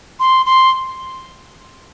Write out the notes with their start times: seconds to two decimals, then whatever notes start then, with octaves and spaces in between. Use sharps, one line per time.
0.20 C6
0.46 C6